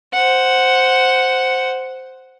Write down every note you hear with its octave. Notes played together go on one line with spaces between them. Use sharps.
C5 F#5